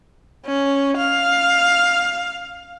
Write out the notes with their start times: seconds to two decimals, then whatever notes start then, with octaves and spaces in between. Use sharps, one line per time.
0.46 C#4
0.97 F5